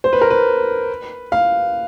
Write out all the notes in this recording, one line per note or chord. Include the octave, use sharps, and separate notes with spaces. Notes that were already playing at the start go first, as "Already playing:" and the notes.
C5
B4
A#4
B4
F5